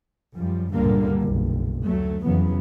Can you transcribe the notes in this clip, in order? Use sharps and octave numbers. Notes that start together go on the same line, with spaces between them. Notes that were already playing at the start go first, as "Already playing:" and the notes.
F#2 F3 G3
C#2 G2 A#2 D3 G3 A#3
F#1 B1
D2 F#3 A3
F2 C#3 E3 F#3 B3